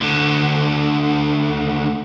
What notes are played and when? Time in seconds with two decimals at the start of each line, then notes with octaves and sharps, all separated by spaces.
0.01 D2 D3